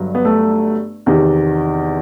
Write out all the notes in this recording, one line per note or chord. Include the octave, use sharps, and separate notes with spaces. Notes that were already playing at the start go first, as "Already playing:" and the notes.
Already playing: G1 G2 F#3
B3
A3
E2 C3 D#3